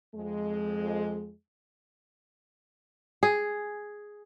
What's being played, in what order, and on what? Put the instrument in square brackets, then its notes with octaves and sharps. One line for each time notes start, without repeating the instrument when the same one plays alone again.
[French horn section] F2 G#3
[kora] G#4